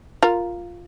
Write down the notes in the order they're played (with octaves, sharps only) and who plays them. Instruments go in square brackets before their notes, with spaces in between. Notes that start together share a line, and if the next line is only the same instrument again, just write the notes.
[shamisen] F4 A#4